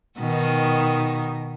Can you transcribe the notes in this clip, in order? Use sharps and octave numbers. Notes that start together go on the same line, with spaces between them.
B2 D#3